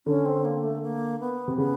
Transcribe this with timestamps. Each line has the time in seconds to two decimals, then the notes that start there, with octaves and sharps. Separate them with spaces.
0.06 D3 C#4
0.25 C4
0.45 A#3
0.63 A3
0.82 A#3
1.20 B3
1.48 C3
1.57 C#3 B3